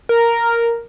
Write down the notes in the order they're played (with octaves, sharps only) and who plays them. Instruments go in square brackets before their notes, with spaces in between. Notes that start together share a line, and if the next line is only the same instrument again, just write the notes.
[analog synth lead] A#4